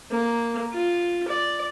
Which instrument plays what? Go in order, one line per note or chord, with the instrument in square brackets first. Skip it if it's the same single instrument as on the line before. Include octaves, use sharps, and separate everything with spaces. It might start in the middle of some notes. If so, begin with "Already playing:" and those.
[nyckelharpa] A#3
F4
D5